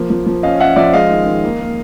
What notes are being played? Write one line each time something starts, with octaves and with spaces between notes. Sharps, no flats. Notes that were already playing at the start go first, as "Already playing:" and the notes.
Already playing: F3 A#3
F3
F3
C#4 D#5 F5
C#4 E5 F#5
F3 D5 E5
G#3 D#5 F5
D#3
D#3
A#3
A#3